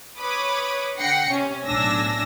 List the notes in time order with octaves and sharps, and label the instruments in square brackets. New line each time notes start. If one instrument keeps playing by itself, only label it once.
[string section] B4 C#5 B5 D6 D#6
D3 F#5 G5 A#6 C7 C#7
C3 C#4
B1 A2 D4 G#5 E6 A#6